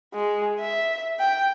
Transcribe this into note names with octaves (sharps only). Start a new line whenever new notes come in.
G#3
E5
G5